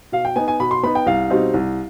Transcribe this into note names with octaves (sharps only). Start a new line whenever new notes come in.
B2 F5
G5
B3 D#4 G#5
G#5
B2 B5
C6
B3 D#4 B5
G5
C2 F5
B2 G3 C4 D#4
C2